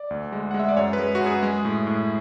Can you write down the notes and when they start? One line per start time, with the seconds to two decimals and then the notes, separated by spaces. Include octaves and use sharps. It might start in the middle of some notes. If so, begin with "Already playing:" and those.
Already playing: D5
0.10 D2
0.32 G#3
0.51 F#5
0.54 G#3
0.59 E5
0.69 D5
0.77 F#2 C#5
0.93 B4
0.99 G#3
1.15 F#4
1.21 F#2
1.26 G#4
1.43 G#3
1.65 A2
1.87 A2